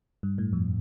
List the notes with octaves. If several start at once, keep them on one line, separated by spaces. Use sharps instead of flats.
G2
A2
F2